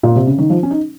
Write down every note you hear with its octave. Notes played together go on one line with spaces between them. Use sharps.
A#2
C3
C#3
D#3
F3
C#4
D#4